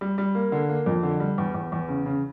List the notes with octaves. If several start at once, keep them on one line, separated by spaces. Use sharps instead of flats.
G3
G3
A#3
D3
A#3
F2
D3
G3
E2
E2
E2
C#3
C#3